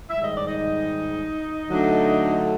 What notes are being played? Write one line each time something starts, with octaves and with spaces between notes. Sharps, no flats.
G#2 D#3 G3 E5
D#5
D5
D#4 D#5
D3 F#3 A3 D4